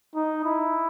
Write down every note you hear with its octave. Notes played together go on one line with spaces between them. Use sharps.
D#4
E4